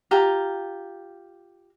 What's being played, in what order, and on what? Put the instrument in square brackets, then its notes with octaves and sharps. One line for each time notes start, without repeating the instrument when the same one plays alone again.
[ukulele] F4 G4 A#5